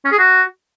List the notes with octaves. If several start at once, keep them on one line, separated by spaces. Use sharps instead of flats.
C#4
G#4
F#4